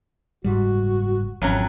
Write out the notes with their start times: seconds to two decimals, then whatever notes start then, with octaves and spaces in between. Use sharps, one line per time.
0.44 F#1 G#2 G3 F#4
1.42 G#1 F2 B2 F#3 C#4 A#5